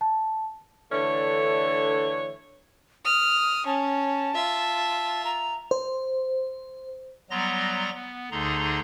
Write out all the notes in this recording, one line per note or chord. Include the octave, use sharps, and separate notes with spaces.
A5
D3 E3 A3 D4 C#5
D#6 F6
C#4 A5
F4 E5
A#5
C5
F#3 G3 B3 A#5 C6 A#6
B3
D2 D3 D#4 G#4 A#5 C6